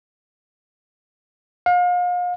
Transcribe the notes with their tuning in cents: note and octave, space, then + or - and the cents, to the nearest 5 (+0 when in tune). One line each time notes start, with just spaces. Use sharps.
F5 +35